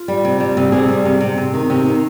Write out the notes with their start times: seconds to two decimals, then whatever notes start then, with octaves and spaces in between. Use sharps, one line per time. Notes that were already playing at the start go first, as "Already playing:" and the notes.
Already playing: F4
0.08 G3
0.25 C3
0.40 G3
0.57 C3
0.72 C3 G#4
0.88 G3
1.05 C3
1.21 C3
1.38 C3
1.54 D#3
1.70 C3
1.85 D#3